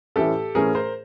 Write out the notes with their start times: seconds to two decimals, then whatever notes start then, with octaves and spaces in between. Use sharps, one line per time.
0.16 A2 E3 A3 C#4 G4 A4
0.55 A2 E3 A3 C#4 G#4 A#4
0.75 A#4 C5